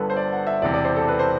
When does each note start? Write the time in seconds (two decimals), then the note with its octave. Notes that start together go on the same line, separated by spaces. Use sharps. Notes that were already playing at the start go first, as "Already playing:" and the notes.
Already playing: G1 G2 D3 A4 B4
0.10 C5
0.17 D5
0.32 F#5
0.47 E5
0.62 E1 E2 C3 D5
0.74 D5
0.85 C5
0.96 A4
1.08 B4
1.19 C5